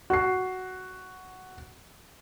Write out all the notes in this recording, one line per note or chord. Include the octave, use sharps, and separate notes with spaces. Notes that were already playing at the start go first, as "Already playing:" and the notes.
F#4 C7